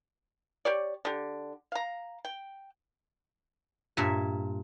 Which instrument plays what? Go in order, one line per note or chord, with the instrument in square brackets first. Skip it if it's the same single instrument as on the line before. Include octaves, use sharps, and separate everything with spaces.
[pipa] G4 C#5 D5
D3 G4
F5 A#5
G5
[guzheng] G2 A#2 E5 G#5